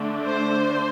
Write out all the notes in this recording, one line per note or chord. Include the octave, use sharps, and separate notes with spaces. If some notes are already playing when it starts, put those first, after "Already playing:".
Already playing: D3 A3 D4
C5